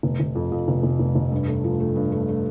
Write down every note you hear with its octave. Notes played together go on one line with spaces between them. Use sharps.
F1
F1
F2
F2
F1
F1
F1
F1
G2
A3
F3
A3
G2
A3
A3